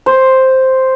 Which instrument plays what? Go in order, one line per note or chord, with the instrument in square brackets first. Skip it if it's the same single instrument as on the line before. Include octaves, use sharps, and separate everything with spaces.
[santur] C5